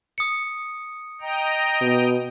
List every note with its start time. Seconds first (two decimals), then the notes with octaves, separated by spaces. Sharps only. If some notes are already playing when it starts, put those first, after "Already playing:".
0.18 D#6 C#7
1.21 D#5 G5 A#5
1.81 B2